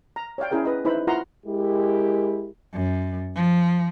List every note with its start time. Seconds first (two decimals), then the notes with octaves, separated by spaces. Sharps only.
0.16 A#5
0.38 C#5 D5 F5 G5
0.51 C#4 E4 G#4 A#4 G5
0.65 B4 D#5
0.85 D#4 E4 B4 C5 E5 B5
1.07 E4 F4 A#4 F#5 A#5 C6
1.46 G#3 E4 G4 A#4
2.74 F#2
3.35 F3